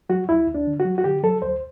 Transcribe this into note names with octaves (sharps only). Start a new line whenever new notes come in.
F#3 F#4
D2 E4
D2
D4
D3
F#4
F#3
F#4
D3 G4
F#3 A4
D2 C5